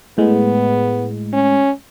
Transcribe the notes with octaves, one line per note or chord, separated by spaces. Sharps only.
A2 G#3 B3
C#4